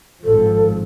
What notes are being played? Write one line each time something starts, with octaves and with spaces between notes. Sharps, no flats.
G#1 F3 A4